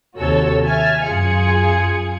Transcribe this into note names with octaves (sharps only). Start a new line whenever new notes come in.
D#2 C3 F#4 A4 C#5 E6
E5 G#5 F6 G#6 A6
F#2 F4 G#4 G#6 C#7